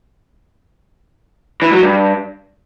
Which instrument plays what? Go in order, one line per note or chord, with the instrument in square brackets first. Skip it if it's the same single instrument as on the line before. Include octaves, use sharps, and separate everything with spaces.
[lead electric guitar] E3
F#3
G2